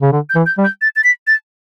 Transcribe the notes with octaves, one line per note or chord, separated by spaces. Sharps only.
C#3
D3
G6
E3
G6
G3
G6
A6
A6
B6
A6